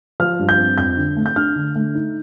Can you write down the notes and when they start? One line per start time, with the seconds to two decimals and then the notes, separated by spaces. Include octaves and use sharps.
0.20 F3 F6
0.39 G2
0.49 G6
0.58 C4
0.78 F2 G6
0.97 D3
1.17 A3
1.26 G6
1.36 D4 F6
1.56 D3
1.76 A3
1.95 D#4